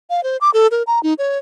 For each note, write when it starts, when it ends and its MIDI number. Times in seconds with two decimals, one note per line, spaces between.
0.10 0.23 77
0.23 0.37 72
0.41 0.50 86
0.54 0.67 69
0.71 0.83 70
0.87 1.02 82
1.03 1.14 63
1.18 1.38 73